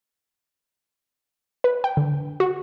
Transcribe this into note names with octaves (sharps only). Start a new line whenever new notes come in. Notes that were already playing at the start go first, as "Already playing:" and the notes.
B4
G5
D3
F#4